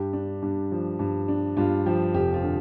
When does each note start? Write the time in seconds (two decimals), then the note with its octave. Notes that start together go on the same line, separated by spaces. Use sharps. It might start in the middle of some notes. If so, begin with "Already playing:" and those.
Already playing: G2 G4
0.13 D4
0.42 G2
0.72 F3
0.99 G2
1.28 D4
1.57 G2 F4
1.86 F3 G4
2.14 F1 G4
2.34 F4
2.44 D3